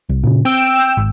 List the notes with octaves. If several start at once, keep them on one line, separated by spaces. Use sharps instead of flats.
C2
A#2 C#3
C4 G5 E6
G#1